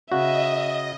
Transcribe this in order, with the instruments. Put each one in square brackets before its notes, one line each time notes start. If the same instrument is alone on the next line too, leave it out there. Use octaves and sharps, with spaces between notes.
[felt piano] C#3 [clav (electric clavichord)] F#4 [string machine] D#5 [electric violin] E5